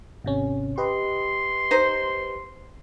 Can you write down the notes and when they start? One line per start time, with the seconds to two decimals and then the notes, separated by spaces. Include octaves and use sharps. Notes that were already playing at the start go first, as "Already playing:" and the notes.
0.24 G#1 C3 C#4
0.78 G4 B4 D#5 C6
1.71 D#4 C5